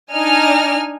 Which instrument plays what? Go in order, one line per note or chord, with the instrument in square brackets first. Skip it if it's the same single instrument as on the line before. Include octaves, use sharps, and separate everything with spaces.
[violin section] D4 D#4 G#5 F6